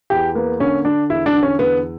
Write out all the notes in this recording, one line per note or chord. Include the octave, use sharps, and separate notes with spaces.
E2 G4
A#3 B3
D3 C#4
D3 D4
E2 E4
D4
D3
C#4
E2 B3